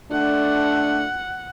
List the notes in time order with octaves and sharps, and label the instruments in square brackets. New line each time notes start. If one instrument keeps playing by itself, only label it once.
[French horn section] D3 A3 D4 [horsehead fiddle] F#5